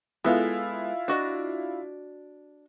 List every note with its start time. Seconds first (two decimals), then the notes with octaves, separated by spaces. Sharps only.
0.24 G#3 B3 E4 F4 A4
1.08 D4 F#4 D#5